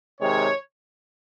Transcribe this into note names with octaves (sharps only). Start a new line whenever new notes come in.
C3 D#3 G#3 C#5